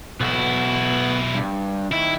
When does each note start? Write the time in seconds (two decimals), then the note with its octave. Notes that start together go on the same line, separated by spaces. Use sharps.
0.21 B1 B3 E4 F#4
1.35 G2
1.92 D#3 E4 E5